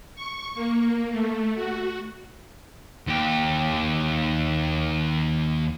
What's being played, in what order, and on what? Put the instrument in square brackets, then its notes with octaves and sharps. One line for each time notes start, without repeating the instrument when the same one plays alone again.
[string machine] C#6
A#3
A3
F#4
[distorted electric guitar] D#2 G4